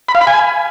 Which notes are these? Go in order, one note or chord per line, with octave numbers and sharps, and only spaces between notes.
B5
F5
B5
G#5